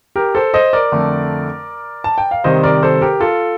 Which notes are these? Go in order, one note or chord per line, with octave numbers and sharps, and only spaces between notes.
G4 A#4
A4 C5
C5 D#5
A#4 D5
F2 D3 A3
A5
G5
F5
C3 D#3 G3 C5 D#5
A#4 D5
A4 C5
G4 A#4
F4 A4